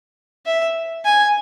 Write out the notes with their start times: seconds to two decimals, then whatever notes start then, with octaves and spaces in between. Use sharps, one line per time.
0.46 E5
1.05 G#5